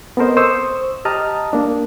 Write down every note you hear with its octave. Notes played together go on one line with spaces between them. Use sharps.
B3 C4 A4 A#4 C5 D#5
C5 C#6 D#6 E6
G4 D#5 A5 A#5 D#6 F6
A#3 D4